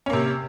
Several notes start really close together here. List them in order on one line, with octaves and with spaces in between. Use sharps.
C#4 A#3 C3